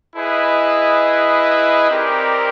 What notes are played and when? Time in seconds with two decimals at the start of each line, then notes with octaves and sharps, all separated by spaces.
0.16 E4 G#4 B4 D#5
1.90 C4 D#4 G4 A#4 D5